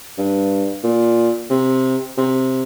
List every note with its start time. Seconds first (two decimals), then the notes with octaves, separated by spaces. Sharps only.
0.18 G2
0.84 A#2
1.50 C3
2.18 C3